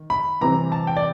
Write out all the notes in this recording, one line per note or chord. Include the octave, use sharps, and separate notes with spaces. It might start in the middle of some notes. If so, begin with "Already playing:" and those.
Already playing: D#3
B5
C3 E3 G3 C4 A#5
A5
G5
D5